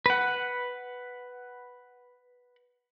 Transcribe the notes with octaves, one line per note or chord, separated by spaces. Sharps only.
B4 F#5